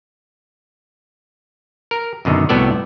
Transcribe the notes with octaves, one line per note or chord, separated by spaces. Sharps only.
A#4
F#2 B2 D3 D#3
C2 A2 B3 F#4 A4 D5